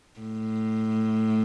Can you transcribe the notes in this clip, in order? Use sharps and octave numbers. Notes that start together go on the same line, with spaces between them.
A2